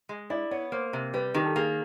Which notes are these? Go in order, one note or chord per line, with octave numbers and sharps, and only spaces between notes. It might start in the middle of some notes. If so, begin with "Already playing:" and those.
G#3
E4 D5
B3 C#5
A#3 C5
C3
G3 B4
D#3 G4
A4
A#3 G#4